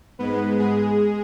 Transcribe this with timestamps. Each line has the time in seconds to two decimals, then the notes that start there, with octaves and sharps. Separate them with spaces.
0.19 G#2 G#3 B3 B4
0.59 G#3 G#4